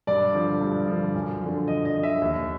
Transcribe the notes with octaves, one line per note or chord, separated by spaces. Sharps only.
G2 D5
D3 F3
G2
D3 F3
F#2
D3 F3
F#2 D#5
D#5
D3 F3
E5
D#2